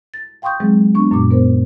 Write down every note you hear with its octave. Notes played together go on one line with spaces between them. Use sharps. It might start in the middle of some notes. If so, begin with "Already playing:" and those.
A6
F5 G5 C6 C#6 D#6 G6
E3 F#3 G#3 C4 G#4
B3 D4 C#6
F#2 A#2 D6
B3 A#4 C5